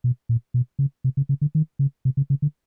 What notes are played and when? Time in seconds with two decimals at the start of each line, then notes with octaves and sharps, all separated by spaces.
0.04 B2
0.29 A#2
0.54 B2
0.79 C#3
1.04 C3
1.17 C#3
1.29 C#3
1.41 D3
1.55 D#3
1.79 C#3
2.05 C3
2.17 C#3
2.30 C#3
2.42 D3